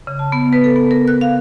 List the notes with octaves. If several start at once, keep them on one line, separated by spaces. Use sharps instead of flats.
C#3
A5
B3
B4
A4
B3
A#4
F#6
F5